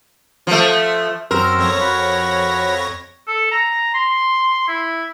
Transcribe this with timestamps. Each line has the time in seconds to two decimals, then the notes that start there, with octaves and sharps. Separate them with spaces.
0.47 F3 A3
1.31 F#2 C4 A#4 E6
1.58 F2 C#5 A#6
1.81 F#4 B5
3.27 A4
3.51 A#5
3.94 C6
4.68 E4